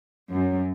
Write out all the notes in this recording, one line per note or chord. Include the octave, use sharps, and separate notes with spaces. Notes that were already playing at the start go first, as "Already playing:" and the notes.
F#2